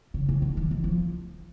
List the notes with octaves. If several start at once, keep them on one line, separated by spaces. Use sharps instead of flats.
C#3
C#3
D3
D#3
E3
F3